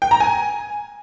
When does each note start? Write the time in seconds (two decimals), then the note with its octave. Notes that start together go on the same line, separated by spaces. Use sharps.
0.02 G5
0.11 A#5
0.20 G#5